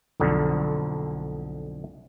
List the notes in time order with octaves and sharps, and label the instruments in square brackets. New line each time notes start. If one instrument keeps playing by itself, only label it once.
[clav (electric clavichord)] B1 F2 D3